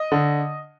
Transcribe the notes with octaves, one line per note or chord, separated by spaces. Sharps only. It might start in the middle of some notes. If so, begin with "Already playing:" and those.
Already playing: D#5 D#6
D3